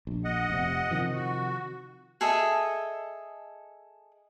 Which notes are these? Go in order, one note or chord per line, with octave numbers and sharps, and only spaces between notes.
A#1
D#5 F#5
F1 C3
C3 D#3 F3
F#4
G#4 A4 D#5 E5